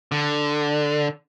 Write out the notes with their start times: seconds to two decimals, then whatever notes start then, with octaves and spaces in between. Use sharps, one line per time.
0.12 D3